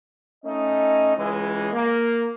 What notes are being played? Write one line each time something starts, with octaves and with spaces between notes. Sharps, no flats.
A3 C#4 D#4 D#5
C#2 E3 G#3
A#3